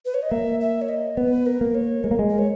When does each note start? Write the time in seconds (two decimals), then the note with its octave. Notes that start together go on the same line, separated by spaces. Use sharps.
0.05 B4
0.14 C#5
0.23 D#5
0.31 A#3 E5
0.60 E5
0.82 C#5
0.89 D#5
1.17 B3 B4
1.46 A#4
1.61 A#3
1.75 C#5
2.04 G#3 A#4
2.11 A#3
2.19 G#3
2.30 A#4
2.39 C#5